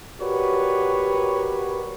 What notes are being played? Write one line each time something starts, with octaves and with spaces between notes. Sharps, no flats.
F#4 G4 A#4 B4 C#5 D5